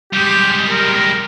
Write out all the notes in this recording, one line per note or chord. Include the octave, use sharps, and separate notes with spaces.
G3 G#3 G4
A#4